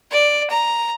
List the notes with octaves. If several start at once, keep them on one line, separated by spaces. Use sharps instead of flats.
D5
A#5